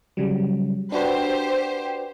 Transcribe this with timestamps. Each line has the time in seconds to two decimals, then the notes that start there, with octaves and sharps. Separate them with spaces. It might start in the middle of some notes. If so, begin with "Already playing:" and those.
0.17 C#3 F#3 G3
0.92 D4 F#4 G4 B4 C5